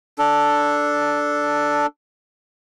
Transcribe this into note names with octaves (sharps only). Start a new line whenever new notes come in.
D4 A4